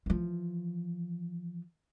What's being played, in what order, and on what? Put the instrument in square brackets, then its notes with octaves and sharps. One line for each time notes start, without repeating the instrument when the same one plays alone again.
[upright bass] E3 F3